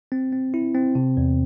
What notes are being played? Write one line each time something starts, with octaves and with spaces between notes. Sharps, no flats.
C4
C4
E4
C4
C3
E2